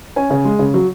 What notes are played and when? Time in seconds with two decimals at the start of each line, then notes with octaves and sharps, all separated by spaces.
0.16 C#4 G#5
0.30 C#3
0.45 G#3
0.59 C#3
0.74 F#3